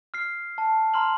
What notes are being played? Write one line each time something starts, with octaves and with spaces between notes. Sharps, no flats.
F6 C7
A5
A#5 C6 F6 F#7